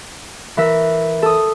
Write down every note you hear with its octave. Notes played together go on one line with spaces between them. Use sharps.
E3 A#4 E5
A4 D#6